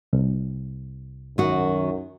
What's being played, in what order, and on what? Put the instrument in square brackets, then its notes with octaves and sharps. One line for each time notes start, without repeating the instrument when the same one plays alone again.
[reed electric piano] C2
[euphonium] F#2 [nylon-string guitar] D#3 F#4